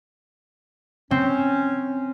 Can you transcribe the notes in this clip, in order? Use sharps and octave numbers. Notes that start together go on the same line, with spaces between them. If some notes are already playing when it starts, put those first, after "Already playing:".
C4 C#4